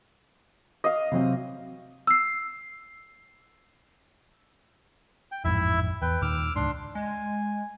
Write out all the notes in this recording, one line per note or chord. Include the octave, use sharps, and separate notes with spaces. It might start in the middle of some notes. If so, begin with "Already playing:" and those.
D#5 F5
C3 F#3 C4
E6 C7
G5
A1 F2 G#2 E4 E5
E2 B4 G5
D#2 A#2 D#3 D6 E6 F6
C#2 G#2 D4 C6
G#3 G#5